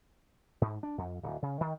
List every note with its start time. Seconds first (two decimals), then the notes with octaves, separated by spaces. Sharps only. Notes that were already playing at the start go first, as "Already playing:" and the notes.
0.61 G#2
0.83 D4
0.98 F2
1.23 D1
1.42 C#3
1.61 D#3